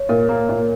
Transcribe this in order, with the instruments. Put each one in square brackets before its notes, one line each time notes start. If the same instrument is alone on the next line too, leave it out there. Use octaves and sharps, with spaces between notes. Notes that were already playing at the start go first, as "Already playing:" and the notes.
Already playing: [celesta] C#5
[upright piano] A#2 [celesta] A#4
[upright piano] A#3
A#2